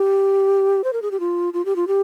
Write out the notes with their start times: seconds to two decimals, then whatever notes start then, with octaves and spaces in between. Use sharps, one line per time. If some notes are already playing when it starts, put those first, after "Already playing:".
Already playing: G4
0.84 C5
0.93 A#4
1.02 G#4
1.11 G4
1.20 F4
1.53 F4
1.65 G4
1.76 F4
1.87 G4